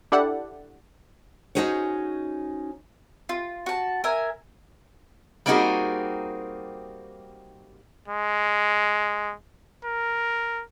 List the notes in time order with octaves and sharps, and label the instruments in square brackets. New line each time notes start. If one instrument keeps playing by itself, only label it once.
[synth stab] D4 E4 G4 A4 D5 F#5
[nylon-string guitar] C#4 D#4 F#4 G#4 C5 C#5
[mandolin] F4
F#4 A5
A#4 E5 G#5
[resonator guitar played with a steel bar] G3 A#3 C4 D#4 F#4 G#4
[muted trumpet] G#3
A#4